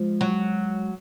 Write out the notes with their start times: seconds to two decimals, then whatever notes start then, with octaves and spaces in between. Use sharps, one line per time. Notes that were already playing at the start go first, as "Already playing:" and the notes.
Already playing: F3 G#3
0.21 F#3